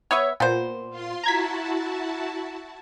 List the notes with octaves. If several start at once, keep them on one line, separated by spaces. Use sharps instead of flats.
B3 B4 C#5 E5
A#2 B3 C5
F4 C6
E4 F#4 A5 A#5 G#6 B6